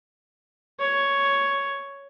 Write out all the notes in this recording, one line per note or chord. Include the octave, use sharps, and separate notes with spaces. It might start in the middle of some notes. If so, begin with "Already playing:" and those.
C#5